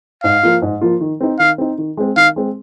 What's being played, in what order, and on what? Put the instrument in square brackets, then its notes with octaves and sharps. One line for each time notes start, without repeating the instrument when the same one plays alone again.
[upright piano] G#2 [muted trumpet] F5
[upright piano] F3 A#3 F4
G#2
F3 A#3 F4
D#3
C4 D#4
[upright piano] D#3 [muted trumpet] F5
[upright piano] C4 D#4
D#3
G#3 C4
[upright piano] D#3 [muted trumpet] F5
[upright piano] G#3 C4